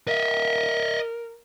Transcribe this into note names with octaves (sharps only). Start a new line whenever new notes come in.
A#4 D#5 E5